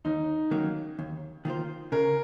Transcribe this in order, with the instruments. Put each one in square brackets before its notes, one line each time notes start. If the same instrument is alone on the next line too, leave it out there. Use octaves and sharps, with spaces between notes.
[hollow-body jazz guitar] D#2 [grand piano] D#4
[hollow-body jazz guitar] D#3 F#3 A#3 C#4
D#2
D#3 A#3 F4 C5
[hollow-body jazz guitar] C#3 [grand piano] A#4